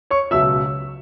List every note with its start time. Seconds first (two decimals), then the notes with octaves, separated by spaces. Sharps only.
0.10 C#5 C#6
0.31 C#2 B2 F#3 E5 E6